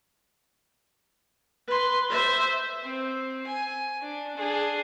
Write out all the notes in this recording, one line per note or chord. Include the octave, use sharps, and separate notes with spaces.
B4 C6
C5 E5
C4
G#5
D4
D4 G#4